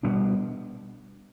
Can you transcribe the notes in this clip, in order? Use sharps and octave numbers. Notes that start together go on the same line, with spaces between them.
B2 G3 B3 D4